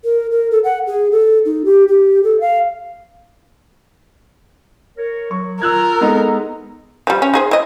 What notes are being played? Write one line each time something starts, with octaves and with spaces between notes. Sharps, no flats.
A#4
A#4
A4
F#5
G#4
A4
D#4
G4
G4
A4
F5
A#4 C#5
F#3 C#6
F4 A#4 E6 F#6 G#6
G#3 B3 D#4 A4 D#5
F3 G3
C#4
D#4 G#4 C5
E4 D#5